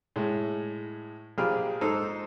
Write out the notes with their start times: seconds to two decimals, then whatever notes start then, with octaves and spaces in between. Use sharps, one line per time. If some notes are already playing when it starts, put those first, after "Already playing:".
0.16 A2 G#3
1.38 A#1 F3 G4 G#4 B5 F6
1.81 G#2 D#4 A4 C5